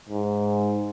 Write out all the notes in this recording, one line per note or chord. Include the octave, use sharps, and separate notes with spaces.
G#2